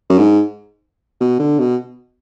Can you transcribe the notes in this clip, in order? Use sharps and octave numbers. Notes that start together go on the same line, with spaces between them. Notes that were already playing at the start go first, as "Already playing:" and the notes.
F#2
G#2
B2
D3
B2